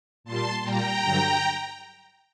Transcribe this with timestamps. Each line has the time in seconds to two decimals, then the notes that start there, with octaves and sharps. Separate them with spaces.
0.24 A#2 G3 A5 C6
0.63 A#2 G3 G5 A#5
1.02 G2 D3 F#3